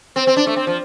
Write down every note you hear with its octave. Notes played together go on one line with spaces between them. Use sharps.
C4
C4
D4
A3
C4
F3